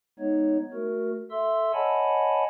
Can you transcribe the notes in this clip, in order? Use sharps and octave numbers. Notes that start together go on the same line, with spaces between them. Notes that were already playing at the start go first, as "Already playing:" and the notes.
G#3 B3 D#4 C#5
A3 F#4 A#4
A4 E5 C6 E6
C#5 D#5 F#5 G#5 A5 B5